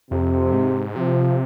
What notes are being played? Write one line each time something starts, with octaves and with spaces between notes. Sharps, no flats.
F2 C3
G#2
C3 F3